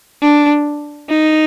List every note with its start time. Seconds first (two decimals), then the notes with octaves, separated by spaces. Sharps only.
0.22 D4
1.09 D#4